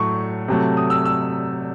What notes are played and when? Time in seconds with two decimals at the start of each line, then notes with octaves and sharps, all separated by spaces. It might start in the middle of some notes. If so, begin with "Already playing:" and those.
Already playing: A2 F#3 A3 C#6
0.48 C3 F#3 A3
0.77 D#6
0.90 E6
1.05 E6